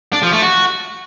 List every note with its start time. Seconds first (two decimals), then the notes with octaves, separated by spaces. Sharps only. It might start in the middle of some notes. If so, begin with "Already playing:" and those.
0.13 D4
0.23 F3
0.32 A3
0.42 F#4